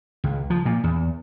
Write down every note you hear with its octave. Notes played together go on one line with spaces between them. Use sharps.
C#2
F3
A#2
E2